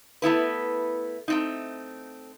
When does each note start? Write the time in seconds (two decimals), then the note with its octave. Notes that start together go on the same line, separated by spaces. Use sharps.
0.22 A3 B3 E4 B4
1.28 A3 C4 D#4